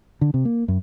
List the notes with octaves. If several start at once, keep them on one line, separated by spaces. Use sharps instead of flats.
D3
C3
A#3
F#2